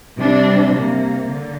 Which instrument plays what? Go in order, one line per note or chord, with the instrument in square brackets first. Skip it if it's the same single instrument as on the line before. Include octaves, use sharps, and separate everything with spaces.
[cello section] C3 G3 C4 D4
C3 A#3
D3